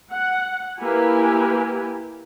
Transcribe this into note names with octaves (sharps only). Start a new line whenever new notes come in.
F#5
A#3 E4 G4 B4 G#5